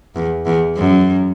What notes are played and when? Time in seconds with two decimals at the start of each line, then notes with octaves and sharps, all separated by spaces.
0.16 E2
0.46 E2
0.77 F#2